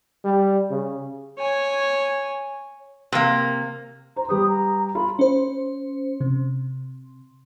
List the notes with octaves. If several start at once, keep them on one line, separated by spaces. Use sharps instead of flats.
G3
C#3
C#5 G#5
C3 A#3
C5 A#5
G3 G4 B4 D#6
A#5
F4 B5
C#4 C5
C3